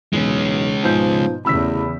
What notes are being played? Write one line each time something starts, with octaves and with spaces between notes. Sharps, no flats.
E1 B1 G#3 C#4
G#2 B2 F3 G6
A1 E2 C#3 B5 E6 B6